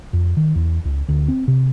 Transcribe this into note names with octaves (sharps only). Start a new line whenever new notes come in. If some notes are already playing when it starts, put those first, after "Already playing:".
F2
D#3
E2
C#2
D2
C4
C3